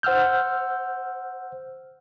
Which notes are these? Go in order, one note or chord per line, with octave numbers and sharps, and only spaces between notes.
C5 F#5 E6 F6 G6